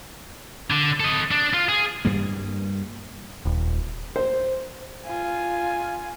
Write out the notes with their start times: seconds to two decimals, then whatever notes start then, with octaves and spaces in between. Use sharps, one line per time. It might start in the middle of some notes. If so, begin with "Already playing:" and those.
0.70 D3
1.00 A4 D#5
1.31 D4
1.54 F4
1.69 G#4
2.05 G2 G3 A#3
3.45 D#1
4.16 C5
5.07 F4 G#5